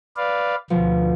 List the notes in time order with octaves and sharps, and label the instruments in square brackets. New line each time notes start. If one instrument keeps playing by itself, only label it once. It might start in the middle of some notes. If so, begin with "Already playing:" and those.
[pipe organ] B4 D5 F5
[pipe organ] D2 [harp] B2 F3